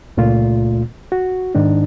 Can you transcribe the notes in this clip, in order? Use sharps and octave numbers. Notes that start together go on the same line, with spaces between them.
C#2 A#2 A3 F4
F#4
G#2 D#3 D4 D#4